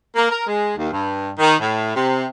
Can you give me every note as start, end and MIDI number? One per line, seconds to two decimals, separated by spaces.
0.16 0.30 58
0.30 0.45 70
0.46 0.77 56
0.77 0.90 39
0.92 1.31 43
1.38 1.55 51
1.60 1.93 45
1.95 2.25 48